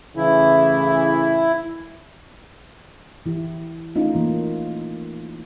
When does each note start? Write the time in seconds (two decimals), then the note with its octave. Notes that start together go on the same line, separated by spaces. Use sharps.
0.17 A2 C#3 E3 E4
3.26 E3 E4 G4
3.96 A3 C#4 D#4 F4
4.15 E3 A#3